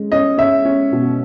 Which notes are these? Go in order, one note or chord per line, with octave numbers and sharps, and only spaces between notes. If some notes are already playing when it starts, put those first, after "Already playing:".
Already playing: G#3 C#4
C#4 D#5
C#4 E5
C#4
B2